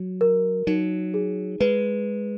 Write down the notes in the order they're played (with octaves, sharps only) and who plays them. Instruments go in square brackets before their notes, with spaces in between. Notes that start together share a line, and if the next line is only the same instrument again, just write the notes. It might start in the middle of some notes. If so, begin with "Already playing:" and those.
Already playing: [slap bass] F#3
[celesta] A#4
[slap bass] F#3 [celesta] D#4
[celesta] G#4
[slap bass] G#3 [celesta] B4